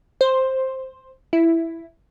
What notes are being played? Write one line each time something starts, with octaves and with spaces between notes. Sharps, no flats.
C5
E4